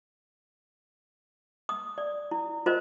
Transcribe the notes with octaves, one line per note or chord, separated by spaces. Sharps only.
D#6
D5
E4
F4 A#4 C5 D#5